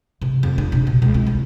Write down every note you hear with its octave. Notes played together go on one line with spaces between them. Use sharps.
C3
F2
D4
C3
B2
C#2
C4
C2